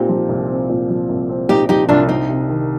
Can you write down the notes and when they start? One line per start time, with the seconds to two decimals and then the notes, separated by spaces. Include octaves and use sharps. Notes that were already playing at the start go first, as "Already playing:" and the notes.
Already playing: A#2 C4 D#4 G4
0.09 F3
0.29 C2
0.49 C4
0.69 A#2
0.90 F3
1.09 C2
1.29 C4
1.49 A#2 D#4 G4
1.69 F3 D#4 G4
1.89 C2 D4 F4
2.09 C2 C4 D#4
2.29 C3
2.49 D#3